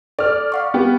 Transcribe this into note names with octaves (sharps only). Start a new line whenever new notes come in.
A4 D5 F6
F5 F#5 C#6
B3 G4